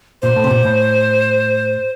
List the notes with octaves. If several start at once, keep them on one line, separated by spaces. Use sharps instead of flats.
A#2 C5
A2
C3
A#2
A2